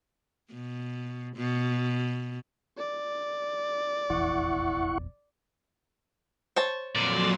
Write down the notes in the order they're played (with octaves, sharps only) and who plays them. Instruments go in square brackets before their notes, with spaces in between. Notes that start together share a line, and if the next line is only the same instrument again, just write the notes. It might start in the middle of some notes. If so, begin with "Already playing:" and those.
[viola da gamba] B2
B2
[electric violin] D5
[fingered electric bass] F1 A#1 E2 [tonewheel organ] E4 F#5 C#6
[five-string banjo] C5 C#5 A5
[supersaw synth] F2 F#3 C6 [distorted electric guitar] A#2 D3 [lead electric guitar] D5